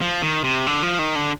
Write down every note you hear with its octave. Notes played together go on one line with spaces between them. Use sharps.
F3
D#3
C3
D3
F3
D#3
D3